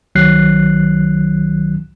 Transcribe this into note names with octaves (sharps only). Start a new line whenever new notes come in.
C2 D#3 F#3 F#6 C7